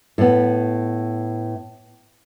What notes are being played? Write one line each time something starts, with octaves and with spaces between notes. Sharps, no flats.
A2 B3